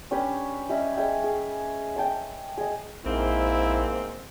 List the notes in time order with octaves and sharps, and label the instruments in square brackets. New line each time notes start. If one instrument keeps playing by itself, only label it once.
[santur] C#4 D4 G4 B4
G3 C#4 D#5 E5
G#4 D#5 E5 G5
G#4
G5 A5 D6
G#4 D#5
[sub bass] A#1 [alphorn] G#2 [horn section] A#3 C4 [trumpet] E4